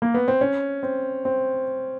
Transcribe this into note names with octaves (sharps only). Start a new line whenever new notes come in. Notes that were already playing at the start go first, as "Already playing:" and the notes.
A#3
B3
C4
C#4
C4
C4